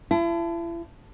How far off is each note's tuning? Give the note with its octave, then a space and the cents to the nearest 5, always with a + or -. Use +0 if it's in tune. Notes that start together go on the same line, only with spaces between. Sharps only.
E4 +40 A5 +0